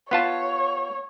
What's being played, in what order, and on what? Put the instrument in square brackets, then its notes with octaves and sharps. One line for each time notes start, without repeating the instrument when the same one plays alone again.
[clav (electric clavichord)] B3 F4 A5 [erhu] C#5